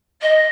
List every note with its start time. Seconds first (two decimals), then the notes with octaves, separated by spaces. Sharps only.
0.21 D#5